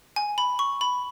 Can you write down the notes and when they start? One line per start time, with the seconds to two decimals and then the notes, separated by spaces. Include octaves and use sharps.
0.16 G#5
0.38 B5
0.59 C#6
0.81 B5